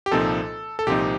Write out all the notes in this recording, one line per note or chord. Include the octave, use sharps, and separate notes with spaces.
G4
C2 A#2 F3 C4 D#4 A4
A4
C2 A#2 F3 C4 D#4 G4